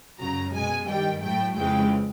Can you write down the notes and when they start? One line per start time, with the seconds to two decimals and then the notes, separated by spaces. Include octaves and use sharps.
0.20 F#2 C#3 F#3 A#5
0.54 B2 G#3 G#5
0.88 G2 D#3 G3 G5
1.22 A2 F#3 A3 G5
1.56 F2 C#3 E3 G#3 G5